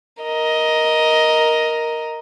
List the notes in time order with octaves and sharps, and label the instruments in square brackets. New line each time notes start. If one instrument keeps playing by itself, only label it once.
[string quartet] A#4 D#5